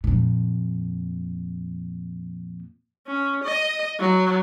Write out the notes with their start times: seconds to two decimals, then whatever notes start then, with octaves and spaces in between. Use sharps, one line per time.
0.04 F2 A#2
3.07 C#4
3.44 D#5
3.99 F#3